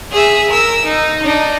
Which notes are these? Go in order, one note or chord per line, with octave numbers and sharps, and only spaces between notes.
G#4 E5
A#4 E6
D#4
D4 D#4